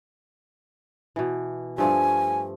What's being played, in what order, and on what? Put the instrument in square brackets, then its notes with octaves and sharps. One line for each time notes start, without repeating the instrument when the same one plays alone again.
[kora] B2 E3
[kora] G2 F3 A3 [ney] G#5